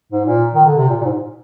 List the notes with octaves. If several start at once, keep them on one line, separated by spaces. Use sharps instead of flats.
G#2
A#2
D#3
D3
C3
A#2
A#2
G#2